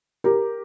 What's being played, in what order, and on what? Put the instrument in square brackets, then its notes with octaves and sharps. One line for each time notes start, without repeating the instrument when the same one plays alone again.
[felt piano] G4 A#4